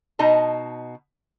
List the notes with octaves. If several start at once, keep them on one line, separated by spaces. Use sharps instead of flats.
B2 D#4 D#5 A5